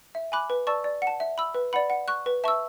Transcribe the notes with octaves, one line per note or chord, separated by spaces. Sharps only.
E5
G#5 B5 D6 F#6
B4
D5 A5 C#6 E6
D5
F#5
A5
E5
B5 E6
B4
D5 F#5 B5
F#5
C#6 F#6
B4
E5 A5 C#6 E6